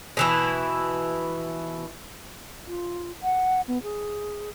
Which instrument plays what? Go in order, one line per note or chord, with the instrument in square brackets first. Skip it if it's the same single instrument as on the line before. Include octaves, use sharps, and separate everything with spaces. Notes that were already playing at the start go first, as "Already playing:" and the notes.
[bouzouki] B2 E3 E4
[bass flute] F4
F#5
B3
G#4